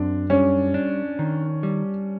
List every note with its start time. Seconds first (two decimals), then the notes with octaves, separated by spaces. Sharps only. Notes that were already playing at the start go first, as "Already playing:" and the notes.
Already playing: F#2 C4 D4
0.30 G3 C#4
0.74 D4
1.19 D#3
1.63 G3